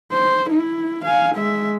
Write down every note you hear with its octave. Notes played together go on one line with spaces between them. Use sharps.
C5
E4
F5 G#5
G#3 E5